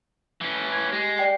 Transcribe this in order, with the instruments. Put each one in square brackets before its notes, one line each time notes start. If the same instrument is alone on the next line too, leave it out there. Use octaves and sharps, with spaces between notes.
[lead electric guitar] E3 C#4
[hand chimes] C6 G#6
[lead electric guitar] G#3 [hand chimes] G4
[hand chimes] D5 G5 C7